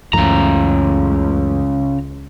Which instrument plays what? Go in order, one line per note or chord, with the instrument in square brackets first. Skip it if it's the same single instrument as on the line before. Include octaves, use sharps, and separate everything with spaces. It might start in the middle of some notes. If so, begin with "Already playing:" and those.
[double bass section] C#2 [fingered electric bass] F#2 E3 A3 [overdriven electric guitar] C#3 A#5